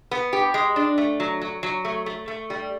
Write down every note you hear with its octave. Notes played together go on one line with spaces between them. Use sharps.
B3
G4
G#3
D4
A3
F#3
F#3
F#3
A3
A3
A3
G3